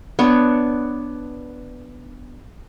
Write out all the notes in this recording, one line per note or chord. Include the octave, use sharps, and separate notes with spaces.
B3 D4 C#5